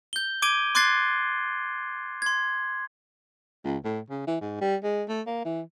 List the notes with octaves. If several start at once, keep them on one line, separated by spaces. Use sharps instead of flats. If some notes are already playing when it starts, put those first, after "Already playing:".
G6 G7
D6 G#6 D7 D#7 G7
C6 D6 F#6 G#6 A6 C7
C6 G#6
C#2
A2
C#3
E3
G#2
G3
G#3
A3
A#3
E3